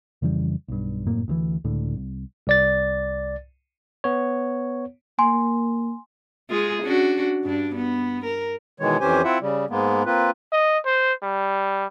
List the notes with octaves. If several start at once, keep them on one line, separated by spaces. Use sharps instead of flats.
F2 C#3 E3 G3
B1 G2
F1 F#2 A2 A#3
D2 C3 E3
C#2 A2 D3
C2
C2 D5 A6
B3 C#5
A#3 G#5 C6
G#3 F4 G#4
C#4 D4 F#4
G2 D4
B3
A#4
B2 D#3 E3 G#3 C#5
F2 E3 C#4 G4 C5 G#5
C4 E4 F4 E5 F#5
C#3 G3
G#2 G#3 A#3 B3
A#3 C4 F4 B4
D#5
C5
G3